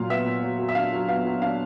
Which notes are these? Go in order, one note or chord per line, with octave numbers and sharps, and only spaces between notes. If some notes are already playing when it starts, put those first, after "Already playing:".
Already playing: A#2 F#3 F5
B3 E5
A#2
F#3
F#3
E5
D4 F5
F#3
B3 F5
F#3
D4 F5